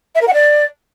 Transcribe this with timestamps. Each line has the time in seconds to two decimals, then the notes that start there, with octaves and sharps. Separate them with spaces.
0.15 E5
0.21 A#4
0.27 F#5
0.34 D5